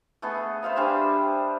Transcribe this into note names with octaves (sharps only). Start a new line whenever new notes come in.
A3 B3 G#4 A4
C5 E5 F5 B5
G3 D4 G#4 C5